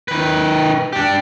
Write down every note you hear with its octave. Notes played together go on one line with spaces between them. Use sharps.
D#3 B4
D4 G4